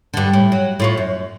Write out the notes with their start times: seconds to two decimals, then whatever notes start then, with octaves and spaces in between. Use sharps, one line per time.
0.14 G2 D3
0.33 A2
0.52 F#3
0.80 A2 F4 C#5
0.98 F#2